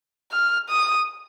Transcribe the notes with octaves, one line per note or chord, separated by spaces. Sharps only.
F6
D#6